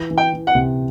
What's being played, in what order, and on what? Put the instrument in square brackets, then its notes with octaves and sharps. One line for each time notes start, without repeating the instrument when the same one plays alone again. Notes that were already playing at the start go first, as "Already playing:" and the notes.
Already playing: [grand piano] E3
E3
[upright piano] G5
[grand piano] E3
[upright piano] F#5
[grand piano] C3